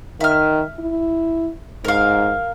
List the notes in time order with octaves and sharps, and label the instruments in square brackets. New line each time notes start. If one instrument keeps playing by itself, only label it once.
[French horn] D#3 [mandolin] E5 F6
[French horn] E4
[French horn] G#2 [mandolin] A#4 F5